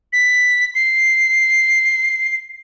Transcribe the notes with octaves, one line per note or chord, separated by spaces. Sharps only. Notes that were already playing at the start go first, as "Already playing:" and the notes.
B6
C7